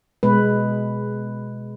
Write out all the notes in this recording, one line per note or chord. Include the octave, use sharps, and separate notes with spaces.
B2 G#3 B4